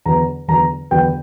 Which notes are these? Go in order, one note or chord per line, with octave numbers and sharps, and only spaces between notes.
E2 D3 F#3 B3 A#5
E2 D3 F#3 B3 A#5
E2 D3 F#3 B3 G5